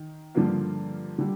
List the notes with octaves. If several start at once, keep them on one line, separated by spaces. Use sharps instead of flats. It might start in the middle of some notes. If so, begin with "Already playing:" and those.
Already playing: D#3
G2 D3 F3 A#3 F4
D3 G3